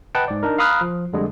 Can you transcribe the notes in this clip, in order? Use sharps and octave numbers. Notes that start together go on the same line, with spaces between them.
B4 D#5 F#5 G5 A5
G#2 D5
D4 D#4 A#4
F5 A#5 B5 D#6 F6 F#6
F3
F2 D3 G3 G#3